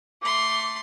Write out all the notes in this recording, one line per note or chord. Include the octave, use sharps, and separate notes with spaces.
A3 C6 D6